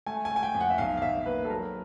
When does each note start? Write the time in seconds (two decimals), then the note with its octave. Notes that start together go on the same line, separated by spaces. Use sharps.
0.06 A3 G#5
0.25 G#5
0.31 A3
0.36 G#5
0.43 G5
0.55 F2
0.61 F#5
0.70 E5
0.78 B1 F5
0.97 F5
1.02 B1 E5
1.26 A#3 B4
1.45 A4
1.50 F#3 A#4